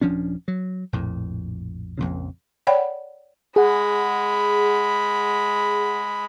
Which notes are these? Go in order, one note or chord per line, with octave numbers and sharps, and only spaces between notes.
D#1 F3 C#4 D4
F#3
A#1 F2 A2
A#1 F2 A#2 C#3
C#5 D5 F#5 G5 B5
G#3 G#4 F#5 B5